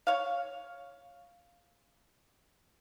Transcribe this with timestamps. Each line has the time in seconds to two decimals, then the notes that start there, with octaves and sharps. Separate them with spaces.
0.07 C#5 F5